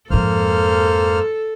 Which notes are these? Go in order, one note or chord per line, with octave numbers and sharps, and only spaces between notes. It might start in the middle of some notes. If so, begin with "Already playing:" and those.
F2 G#2 A#3 A4 C5 F6